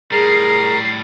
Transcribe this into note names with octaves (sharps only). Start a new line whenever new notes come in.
A2 G3 G#4 A#4 A#5 C7